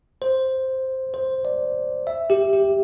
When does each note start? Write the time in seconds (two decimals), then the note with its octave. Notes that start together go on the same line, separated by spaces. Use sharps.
0.22 C5
1.14 C5
1.45 D5
2.07 E5
2.30 G4
2.53 G4